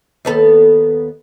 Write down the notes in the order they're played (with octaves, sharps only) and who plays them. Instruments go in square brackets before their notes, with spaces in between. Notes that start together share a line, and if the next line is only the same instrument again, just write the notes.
[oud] D#2 B3 A4